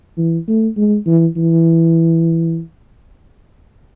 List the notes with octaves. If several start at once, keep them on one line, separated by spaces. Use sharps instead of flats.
E3
A3
G#3
E3
E3